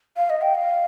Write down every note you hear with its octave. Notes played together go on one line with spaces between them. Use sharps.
F5
D#5
G5
F5